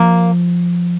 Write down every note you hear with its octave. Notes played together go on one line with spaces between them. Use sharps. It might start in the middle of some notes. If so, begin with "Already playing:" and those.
Already playing: F3 A#3